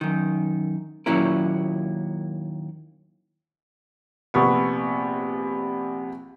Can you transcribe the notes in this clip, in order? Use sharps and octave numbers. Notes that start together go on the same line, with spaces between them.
F#2 D#3
D#2 A#2 F#3 C#4 E4 A#4
A#1 C3 B3 C#6